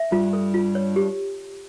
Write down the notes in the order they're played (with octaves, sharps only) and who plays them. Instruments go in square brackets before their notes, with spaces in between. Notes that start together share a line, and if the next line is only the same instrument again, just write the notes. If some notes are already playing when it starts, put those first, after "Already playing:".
Already playing: [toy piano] E5
[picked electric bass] G2 G3 [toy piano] F4
[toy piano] A4
F4
C#5
G4